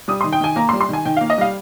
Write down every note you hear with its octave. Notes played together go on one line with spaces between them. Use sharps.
G3 D#6
D#3 C6
G5
D#3 G#5
A#3 A#5
C6
G3
C6
D#3 G#5
D#3 G5
A#3 F5
D#5
G3 F5